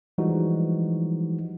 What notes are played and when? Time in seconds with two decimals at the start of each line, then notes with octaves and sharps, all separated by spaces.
0.18 E3 F3 G3 G#3 D#4 F#4